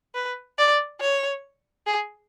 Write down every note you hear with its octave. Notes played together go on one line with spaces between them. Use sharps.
B4
D5
C#5
G#4